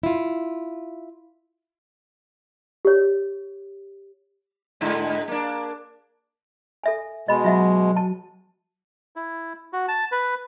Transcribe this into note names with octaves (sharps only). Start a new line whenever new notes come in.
E4 F4
G4 C#5
G#2 D3 G#3
A#3 D4
A4 E5 G#5
B2 G#3 D#5 B5
F#3 F4 E5 F#5
A5
E4
F#4
A5
B4